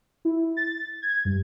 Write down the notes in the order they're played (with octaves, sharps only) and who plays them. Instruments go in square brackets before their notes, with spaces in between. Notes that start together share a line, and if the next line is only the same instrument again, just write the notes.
[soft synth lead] E4
A6
G#6
G2